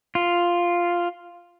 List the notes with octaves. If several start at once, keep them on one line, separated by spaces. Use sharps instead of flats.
F4